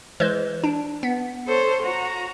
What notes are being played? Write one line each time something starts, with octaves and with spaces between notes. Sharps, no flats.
E3 G#3 C5
D4
B3
A4 C5 C#5
F#4 A#5